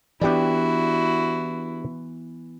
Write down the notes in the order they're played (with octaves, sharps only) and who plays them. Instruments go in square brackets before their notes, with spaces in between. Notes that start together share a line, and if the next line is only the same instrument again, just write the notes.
[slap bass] E3 B3 [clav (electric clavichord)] D4 G4 D5 [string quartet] E4 F#4